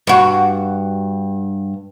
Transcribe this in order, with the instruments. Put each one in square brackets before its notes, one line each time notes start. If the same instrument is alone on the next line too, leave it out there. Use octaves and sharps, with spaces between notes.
[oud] G2 F#4